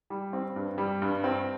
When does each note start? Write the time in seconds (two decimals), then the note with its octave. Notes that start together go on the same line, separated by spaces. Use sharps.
0.10 G3
0.33 C4
0.56 G2
0.78 G3
1.02 G2
1.24 C4